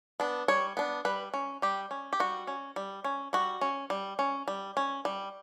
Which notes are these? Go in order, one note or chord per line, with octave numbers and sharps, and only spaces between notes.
B3 D4
G3 C#5
B3 D4
G3 B4
C#4
G3 G4
C#4
G4
G3 F#4
C#4
G3
C#4
G3 F#4
C#4
G3
C#4
G3
C#4
G3